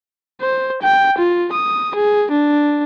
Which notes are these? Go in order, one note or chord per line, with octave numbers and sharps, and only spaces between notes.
C5
G5
F4
D#6
G#4
D4